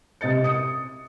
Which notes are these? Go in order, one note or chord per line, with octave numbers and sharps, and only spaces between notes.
C3 D#5 A6 C#7
D#6 C#7